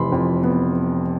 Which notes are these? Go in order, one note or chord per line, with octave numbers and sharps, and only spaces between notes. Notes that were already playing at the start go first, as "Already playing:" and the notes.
Already playing: F1 E3 B5 C6
F2
B3